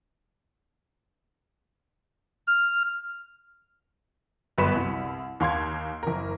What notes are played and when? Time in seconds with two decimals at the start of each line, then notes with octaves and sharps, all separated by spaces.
2.47 F6
4.58 G1 F#2 B4 C6 B6 E7
4.74 C2
5.40 D#2 F5 C6 G#6
6.03 F#1 A#4